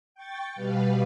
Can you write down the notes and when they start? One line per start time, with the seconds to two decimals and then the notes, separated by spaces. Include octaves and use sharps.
0.15 G5 C#6 A6
0.55 B2 G3 B4 F5